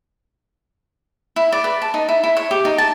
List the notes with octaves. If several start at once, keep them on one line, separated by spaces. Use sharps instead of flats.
E4
D5
B4
A5
D#4
E4
E4
C#5
G4
D#4
A5